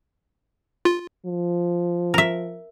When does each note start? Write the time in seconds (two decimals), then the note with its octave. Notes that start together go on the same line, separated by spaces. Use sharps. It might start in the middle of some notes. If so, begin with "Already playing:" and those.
0.85 F4
1.26 F3
2.14 A#4 E5